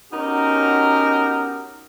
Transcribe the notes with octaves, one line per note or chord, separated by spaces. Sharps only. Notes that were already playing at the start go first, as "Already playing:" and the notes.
B3 C#4 D#4 F#4 G4 A#4